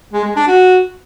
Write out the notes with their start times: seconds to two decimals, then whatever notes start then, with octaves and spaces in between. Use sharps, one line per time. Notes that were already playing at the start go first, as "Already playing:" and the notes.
0.13 G#3
0.24 G#3
0.36 D4
0.47 F#4